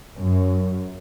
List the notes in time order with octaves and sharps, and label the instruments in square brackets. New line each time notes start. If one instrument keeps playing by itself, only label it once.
[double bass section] F#2